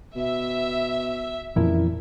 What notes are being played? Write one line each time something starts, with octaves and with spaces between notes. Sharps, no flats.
B2 E5
F#1 F2 A#2 E3 F3 E4 A#4